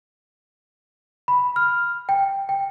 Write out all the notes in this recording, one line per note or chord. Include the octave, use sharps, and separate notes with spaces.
B5
F6
G5
G5